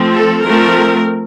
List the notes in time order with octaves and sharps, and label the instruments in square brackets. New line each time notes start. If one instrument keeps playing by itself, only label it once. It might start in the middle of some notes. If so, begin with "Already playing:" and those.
Already playing: [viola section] F3 A3 C4
A4
F3 A3 C4 A#4